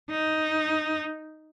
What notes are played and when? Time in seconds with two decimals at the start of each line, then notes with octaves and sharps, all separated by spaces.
0.11 D#4